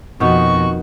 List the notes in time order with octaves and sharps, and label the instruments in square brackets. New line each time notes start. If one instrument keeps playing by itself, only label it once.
[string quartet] F2 F#4 [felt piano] B2 [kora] D#3 B3 D#4 [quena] C#6